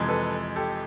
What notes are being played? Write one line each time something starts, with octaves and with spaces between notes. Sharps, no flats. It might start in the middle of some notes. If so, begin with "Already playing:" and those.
Already playing: F2 C3 E3 G#3
A4 B4
G4 A4